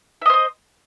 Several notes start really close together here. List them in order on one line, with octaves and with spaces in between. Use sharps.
E5 D#5 C5 D#6